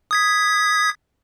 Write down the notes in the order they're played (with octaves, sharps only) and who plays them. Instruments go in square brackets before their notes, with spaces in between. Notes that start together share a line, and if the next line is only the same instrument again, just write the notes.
[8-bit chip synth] D#6 G#6 B6